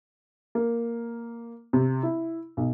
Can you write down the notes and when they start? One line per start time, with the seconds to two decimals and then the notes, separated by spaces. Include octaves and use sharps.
0.55 A#3
1.73 C3
2.03 E4
2.57 B1